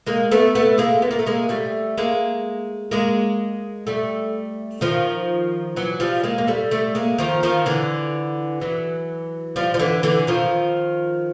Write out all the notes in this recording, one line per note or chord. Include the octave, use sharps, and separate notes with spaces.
G#3 A#3
A3 B3
A3 B3
G#3 A#3
B3
A#3
A3
G#3 A#3
G3 A3
G#3 A#3
G#3 A#3
G3 A3
D#3 F3
E3 F#3
F3 G3
G#3 A#3
A#3
G3 A3
G3 A3
G#3 A#3
D#3 F3
D#3 F3
D3 E3
E3 F#3
F3 G3
F3
D3 E3
D3 E3
D#3 F3